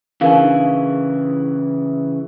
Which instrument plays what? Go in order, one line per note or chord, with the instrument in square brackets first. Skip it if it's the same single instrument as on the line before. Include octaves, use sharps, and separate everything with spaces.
[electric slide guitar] C#3 E3 [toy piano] D4 A#4 F5